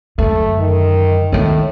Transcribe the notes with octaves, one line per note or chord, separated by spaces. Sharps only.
F#2 D3 A3
D#3
A2 D#3 B3